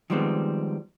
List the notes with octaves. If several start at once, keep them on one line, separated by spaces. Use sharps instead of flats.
D#3 F3 G3 G#3 B3 C4